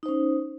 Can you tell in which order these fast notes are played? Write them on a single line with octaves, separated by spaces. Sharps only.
D#4 C5 C#4